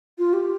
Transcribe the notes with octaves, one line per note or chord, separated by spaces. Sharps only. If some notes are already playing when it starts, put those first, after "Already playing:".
F4
G4